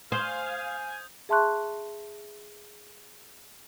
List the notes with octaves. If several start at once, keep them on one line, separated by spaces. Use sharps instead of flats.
C5 F5 G#5 D#6 G6
G#4 E5 A5 C6 C#6 F#6